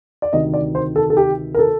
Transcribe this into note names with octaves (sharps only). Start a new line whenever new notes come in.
D5
D2 C3 D#3 D#5
D5
C5
A4
A4
G4
A#4
A4